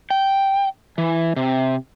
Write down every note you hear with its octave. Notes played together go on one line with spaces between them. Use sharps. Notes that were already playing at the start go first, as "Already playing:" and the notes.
G5
E3
C3